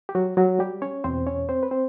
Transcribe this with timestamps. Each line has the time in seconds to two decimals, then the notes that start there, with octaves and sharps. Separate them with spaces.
0.09 G4
0.15 F#3 F#4
0.37 F#3 F#4
0.59 G3 G4
0.82 C#4 C#5
1.04 E2 B2 C4 C5
1.27 C#4 C#5
1.49 C4 C5
1.63 B4
1.71 C4 C5